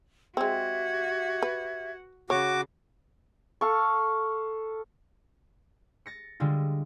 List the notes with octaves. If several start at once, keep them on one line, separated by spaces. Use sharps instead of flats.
G#3 C4 F#4 G4 E5 G#6
B4
C#3 F#4 C#5 D6
A4 F5 C#6
A6 A#6 C#7
D3 G3 G#3 F4